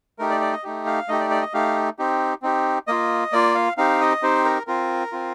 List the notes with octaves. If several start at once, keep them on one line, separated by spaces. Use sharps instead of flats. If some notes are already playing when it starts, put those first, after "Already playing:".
A3 D#4 G4 A#4
D5
D5
D#5
A3 D#4 G4
F5
A3 D#4 G4 D#5
D5
D5
D#5
A3 D#4 G4 F5
C4 D#4 G4
C4 D#4 G4
A#3 F4 D#5
A#3 F4 D5
F5
C4 D#4 G4 F5
D#5
C4 D#4 G4 C5
A#4
C4 F4 A#4
C4 F4